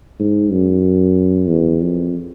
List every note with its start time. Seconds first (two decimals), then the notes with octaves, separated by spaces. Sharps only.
0.19 G#2
0.51 F#2
1.48 E2
1.81 F2